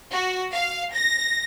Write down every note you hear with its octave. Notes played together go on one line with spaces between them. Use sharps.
F#4
F5
A#6